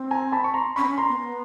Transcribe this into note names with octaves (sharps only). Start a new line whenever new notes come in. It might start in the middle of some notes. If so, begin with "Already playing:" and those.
Already playing: C4
G#5 A#5
A5 B5
C#6
A#5 C6
C#4 B5 C#6
C4
C#4
A#5 C6
B3
B3